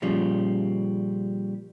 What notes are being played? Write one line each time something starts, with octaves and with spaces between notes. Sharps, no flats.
A#2 C#3 F3 G3